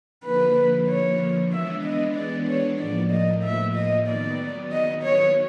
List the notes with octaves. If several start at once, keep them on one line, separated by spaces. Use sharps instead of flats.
D3 F3 A#3 B4
C#5
E3 G#3 B3 D4 E5
D#5
D5
C#5
A2 F3 A#3 D5
D#5
E5
D#5
D#3 F#3 B3 D5
D#5
C#5